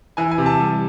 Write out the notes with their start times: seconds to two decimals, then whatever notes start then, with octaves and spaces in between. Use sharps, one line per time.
0.17 E3 G#5
0.31 G#5
0.38 C3
0.46 A5
0.60 G3